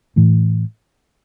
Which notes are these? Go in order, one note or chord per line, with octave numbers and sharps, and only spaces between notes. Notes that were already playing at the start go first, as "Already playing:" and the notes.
A2 E3 A3